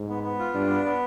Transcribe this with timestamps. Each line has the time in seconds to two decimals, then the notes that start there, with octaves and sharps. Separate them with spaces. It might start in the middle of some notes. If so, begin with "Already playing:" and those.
Already playing: G#2
0.09 B3
0.23 B3
0.39 F4
0.54 G2 D4
0.70 B3
0.85 B3